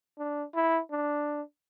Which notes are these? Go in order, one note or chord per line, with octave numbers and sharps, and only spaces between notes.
D4
E4
D4